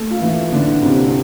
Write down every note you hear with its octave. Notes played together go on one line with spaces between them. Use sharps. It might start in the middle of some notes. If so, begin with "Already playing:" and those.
Already playing: A3 A4
F4
E3 E4
D3 D4
C3 C4
C4